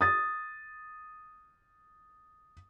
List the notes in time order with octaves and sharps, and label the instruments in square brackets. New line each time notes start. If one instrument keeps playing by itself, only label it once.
[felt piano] D#6 A6